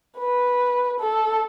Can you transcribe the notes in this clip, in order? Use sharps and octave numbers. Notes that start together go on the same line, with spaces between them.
B4
A4